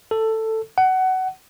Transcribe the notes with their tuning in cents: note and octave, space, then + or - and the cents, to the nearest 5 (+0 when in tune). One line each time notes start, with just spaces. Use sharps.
A4 +10
F#5 +20